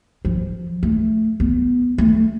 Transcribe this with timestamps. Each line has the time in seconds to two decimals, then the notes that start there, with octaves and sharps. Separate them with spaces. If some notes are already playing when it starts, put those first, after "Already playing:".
0.25 F3
0.83 A3
1.40 B3
1.98 A3